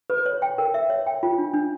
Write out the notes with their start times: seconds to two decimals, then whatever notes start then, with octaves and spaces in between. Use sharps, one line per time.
0.10 B4
0.26 C#5
0.42 G5
0.58 A#4
0.74 E5
0.90 C#5
1.07 G5
1.23 F4
1.38 D4
1.54 D4